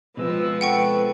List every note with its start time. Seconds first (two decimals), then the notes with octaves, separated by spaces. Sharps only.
0.17 B2 F3 G#3 C4 B4 E6
0.61 A4 B4 F#5 G5 C#6